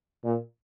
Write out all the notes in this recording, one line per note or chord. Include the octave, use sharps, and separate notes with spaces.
A#2